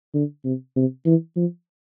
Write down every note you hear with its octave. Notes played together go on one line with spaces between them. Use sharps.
D3
C3
C3
E3
F3